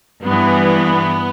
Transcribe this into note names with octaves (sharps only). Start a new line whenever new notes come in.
G2 E3 B3